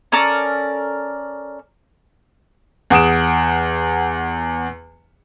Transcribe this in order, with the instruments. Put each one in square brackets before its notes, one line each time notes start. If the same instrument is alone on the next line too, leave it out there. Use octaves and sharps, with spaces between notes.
[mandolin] C#4 A4 A#4 D5
[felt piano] E2 F#5 D#6 D7 E7